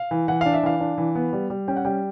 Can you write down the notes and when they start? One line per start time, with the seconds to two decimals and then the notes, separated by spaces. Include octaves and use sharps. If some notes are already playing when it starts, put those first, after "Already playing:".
Already playing: F5
0.11 E3
0.28 E3 F#5
0.41 D4 F5
0.54 E5
0.63 E3 F5
0.81 D4
0.98 E3
1.15 B3
1.33 G3
1.50 G3
1.68 C#4 G5
1.76 F#5
1.85 G3 G5